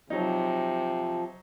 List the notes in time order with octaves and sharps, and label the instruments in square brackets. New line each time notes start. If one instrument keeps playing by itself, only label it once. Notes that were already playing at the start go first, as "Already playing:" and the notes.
[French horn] C3 [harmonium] F3 [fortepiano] F#3 D#4